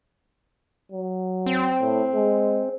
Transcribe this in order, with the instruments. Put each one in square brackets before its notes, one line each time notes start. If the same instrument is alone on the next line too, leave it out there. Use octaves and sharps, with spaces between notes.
[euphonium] F#3
[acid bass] C4
[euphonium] A2
G#3